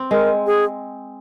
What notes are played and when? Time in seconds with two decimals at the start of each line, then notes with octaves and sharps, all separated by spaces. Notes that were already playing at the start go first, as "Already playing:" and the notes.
Already playing: C4
0.11 G#3 A#4
0.46 G#4